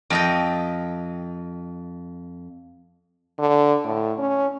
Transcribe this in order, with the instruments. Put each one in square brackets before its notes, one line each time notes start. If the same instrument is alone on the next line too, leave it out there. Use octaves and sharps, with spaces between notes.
[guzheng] F2 D#5 G5
[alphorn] D3
A2
C#4